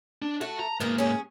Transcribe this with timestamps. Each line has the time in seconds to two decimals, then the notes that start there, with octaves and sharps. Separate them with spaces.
0.22 D4
0.41 A3 F#4
0.60 A#5
0.80 G#2 A#3 B3 A#4
0.98 C#4 G#4